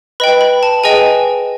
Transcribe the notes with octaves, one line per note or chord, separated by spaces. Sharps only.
B4 D#5 G5 B5
B5
A5
G#4 B4 D#5 G5 G#5